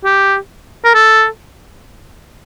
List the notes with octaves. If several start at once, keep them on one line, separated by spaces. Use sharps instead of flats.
G4
A#4
A4